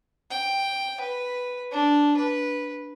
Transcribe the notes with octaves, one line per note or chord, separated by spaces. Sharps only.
G5
B4
D4
B4